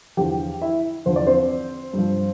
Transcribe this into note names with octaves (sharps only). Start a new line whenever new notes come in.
E2 D3 F3 G4 G5
E4 E5
E2 D3 F3 C5
D5
C4 C5
G2 F3